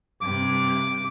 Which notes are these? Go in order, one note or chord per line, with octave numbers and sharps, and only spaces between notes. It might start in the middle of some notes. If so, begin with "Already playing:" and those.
G2 C3 D6